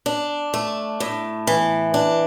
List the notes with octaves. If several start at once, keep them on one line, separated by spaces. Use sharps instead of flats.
D4
A3
A2
E3
D4